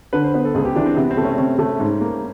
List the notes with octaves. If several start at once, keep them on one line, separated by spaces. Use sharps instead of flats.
D3 B4
C5
B3 B4
A4
C#2 G#4
G4
E3 D4
C4
C3 B3
C4
A3
C#4
C3 C#4
A3
G#2
A#3